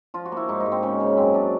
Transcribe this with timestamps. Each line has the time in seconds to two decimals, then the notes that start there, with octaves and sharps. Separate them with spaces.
0.14 F3 F4
0.25 F#4
0.32 A#3 E4
0.49 G#2 D#4
0.60 D#4
0.66 G#2
0.72 C4
0.83 C#3 C#4
1.00 C#3
1.17 F#2 C4
1.34 F#2 D4